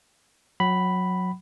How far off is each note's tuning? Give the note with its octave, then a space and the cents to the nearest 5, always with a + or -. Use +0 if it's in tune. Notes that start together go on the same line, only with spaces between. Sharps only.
F#3 -20 F#5 +35 B5 +0